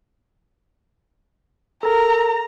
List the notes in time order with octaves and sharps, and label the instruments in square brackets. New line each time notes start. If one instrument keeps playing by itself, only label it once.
[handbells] A4 A#4 [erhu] A#5